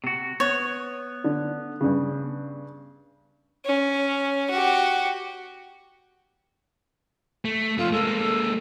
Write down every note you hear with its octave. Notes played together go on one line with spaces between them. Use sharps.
C3 F#4
B3 C#5
D3
G2 C#3
C#4
F#4 G4
A3
F2 A3 F4
G#3 A#3 A4